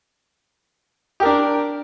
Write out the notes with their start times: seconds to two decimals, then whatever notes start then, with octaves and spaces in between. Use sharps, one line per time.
1.20 G4
1.23 A#4
1.25 D4